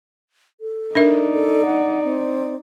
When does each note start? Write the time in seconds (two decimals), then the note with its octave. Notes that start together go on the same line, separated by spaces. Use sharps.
0.61 A4
0.95 D4 D#4 A#4 D5 E5
1.33 A4
1.65 F#5
2.03 C4